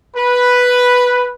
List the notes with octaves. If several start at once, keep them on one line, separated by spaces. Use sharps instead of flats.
B4